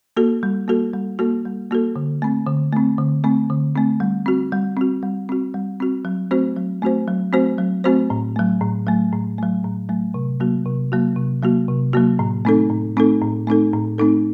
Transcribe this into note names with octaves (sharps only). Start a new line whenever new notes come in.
A#3 F#4 A4
G3
A#3 F#4 A4
G3
A#3 F#4 A4
G3
A#3 F#4 A4
D3
A3 C4
D3
A3 C4
D3
A3 C4
D3
A3 C4
G3
C4 F#4
G3
C4 F#4
G3
C4 F#4
G3
C4 F#4
F#3
A3 C4 F#4 C5
F#3
A3 C4 F#4 C5
F#3
A3 C4 F#4 C5
F#3
A3 C4 F#4 C5
A2
F#3 A3
A2
F#3 A3
A2
F#3 A3
A2
F#3 A3
C3
F#3 A#3 F#4
C3
F#3 A#3 F#4
C3
F#3 A#3 F#4
C3
F#3 A#3 F#4
A2
A3 C4 D#4 A4
A2
A3 C4 D#4 A4
A2
A3 C4 D#4 A4
A2
A3 C4 D#4 A4